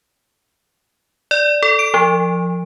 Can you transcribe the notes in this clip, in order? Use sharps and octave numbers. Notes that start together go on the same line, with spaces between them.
D5
A4
D7
F3